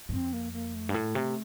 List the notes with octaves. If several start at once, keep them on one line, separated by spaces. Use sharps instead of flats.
G2
F2 C4
A#3
A#3
A3
G2
A2
C3